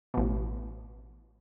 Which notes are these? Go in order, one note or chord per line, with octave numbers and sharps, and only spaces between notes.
A1 B2